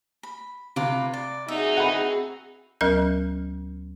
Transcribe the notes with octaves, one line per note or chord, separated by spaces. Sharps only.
B5
C3 F4 B4 D6
D5
C4 D#4 F#4 G#4 E5
F#5 B5
D2 F#3 C#4 A#4 F6 G6